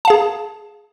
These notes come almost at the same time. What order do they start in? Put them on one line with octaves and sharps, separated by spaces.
A5 F5 G#4